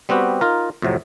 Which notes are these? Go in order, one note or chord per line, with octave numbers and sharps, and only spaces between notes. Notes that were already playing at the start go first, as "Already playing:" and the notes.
G3 B3 C4 F#4 G4
D#4 F4 A#4
F2 A2 C3 F#3